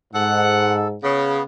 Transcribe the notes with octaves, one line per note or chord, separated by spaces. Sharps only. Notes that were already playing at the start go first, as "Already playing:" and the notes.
G#2 A4 F#5
C#3 B3